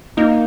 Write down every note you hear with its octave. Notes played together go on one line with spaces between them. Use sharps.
A#3 D#4